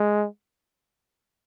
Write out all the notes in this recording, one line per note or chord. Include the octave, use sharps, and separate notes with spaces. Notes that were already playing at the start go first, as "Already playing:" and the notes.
Already playing: G#3